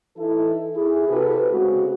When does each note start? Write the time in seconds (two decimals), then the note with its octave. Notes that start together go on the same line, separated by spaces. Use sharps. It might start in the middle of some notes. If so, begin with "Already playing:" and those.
0.17 E3 D#4 E4 A4
0.75 E4 G#4
1.08 C3 F#4 G4 A4 B4
1.51 C#3 G#3 A3 C4 F#4 G#4